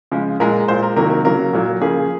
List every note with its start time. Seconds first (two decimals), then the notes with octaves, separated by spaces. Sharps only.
0.12 C#3 F3 G#3
0.40 A#2 G#3 A#4
0.68 A#2 G#3 C5
0.83 A#4
0.96 C3 D#3 F#3 A#3 A#4
1.10 A#4
1.25 C#3 F#3 A#3 A#4
1.53 A#2 F#3 A#3
1.81 C#3 F3 A#3 G#4